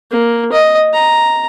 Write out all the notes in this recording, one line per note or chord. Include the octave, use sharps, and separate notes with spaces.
A#3
D#5
A#5